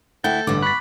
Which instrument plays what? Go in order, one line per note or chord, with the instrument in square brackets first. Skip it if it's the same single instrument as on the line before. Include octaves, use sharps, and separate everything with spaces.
[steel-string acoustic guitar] D2 E4 [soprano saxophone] A4 [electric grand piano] F#5 G5 [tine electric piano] G6
[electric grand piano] A1 D6 [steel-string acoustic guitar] G2 B3 [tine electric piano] D3
[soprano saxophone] B5 [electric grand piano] C#6 A6 [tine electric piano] F#6 B6